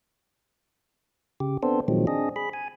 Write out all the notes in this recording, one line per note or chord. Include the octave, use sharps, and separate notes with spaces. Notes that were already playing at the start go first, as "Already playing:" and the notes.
C#3 G4
B3 C4 D4 A4 C5
A#2 D#3 F3 F#3 G#3 C4
C4 D4 G#4 D#5
G#4 B5
G#5